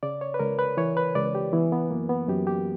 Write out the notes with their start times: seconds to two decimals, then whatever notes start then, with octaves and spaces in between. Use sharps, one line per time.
0.03 C#3 D5
0.21 C#5
0.34 B4
0.39 C#2 A#4
0.59 B4
0.77 E3 C#5
0.97 B4
1.15 C#2 D5
1.35 G4
1.53 E3 B3
1.72 B3
1.91 F#2 A#3
2.09 B3
2.28 F#2 G4
2.47 G4